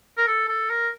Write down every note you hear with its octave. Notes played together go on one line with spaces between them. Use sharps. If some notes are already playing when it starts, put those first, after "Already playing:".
A#4
A4
A4
A#4